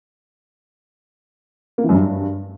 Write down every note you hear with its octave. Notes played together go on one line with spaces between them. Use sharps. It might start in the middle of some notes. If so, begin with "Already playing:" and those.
A#3
E3
F#2
G2